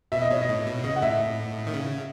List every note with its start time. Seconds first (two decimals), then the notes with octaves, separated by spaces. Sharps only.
0.12 B2 E5
0.21 D#5
0.30 B2 C#5
0.41 D#5
0.49 A2
0.66 B2
0.84 C#3 D#5
0.96 F#5
1.02 A2 E5
1.67 D#3
1.74 C#3